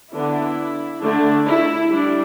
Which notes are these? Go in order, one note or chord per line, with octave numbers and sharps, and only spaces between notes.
D3 B3 D4 E4
D3 A3 D4
E4
G3 D4